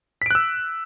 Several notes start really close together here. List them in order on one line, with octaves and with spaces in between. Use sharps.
B6 D7 F#6 E6